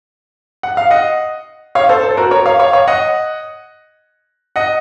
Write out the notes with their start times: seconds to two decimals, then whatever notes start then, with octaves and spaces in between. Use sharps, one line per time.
0.63 F#5
0.77 F5
0.91 D#5 F#5
1.75 C#5 F5
1.89 A4 C5
2.03 A4
2.11 C5
2.17 F#4 A#4
2.31 A#4 C#5
2.46 C#5 F5
2.59 C#5 F5
2.73 C#5 F5
2.88 D#5 F#5
4.56 D#5 F#5